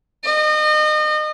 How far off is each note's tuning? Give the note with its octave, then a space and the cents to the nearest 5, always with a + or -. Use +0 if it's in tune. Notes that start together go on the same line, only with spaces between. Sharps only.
D#5 -30